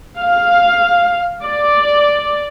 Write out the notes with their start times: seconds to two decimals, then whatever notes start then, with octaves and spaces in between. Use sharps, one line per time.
0.18 F5
1.44 D5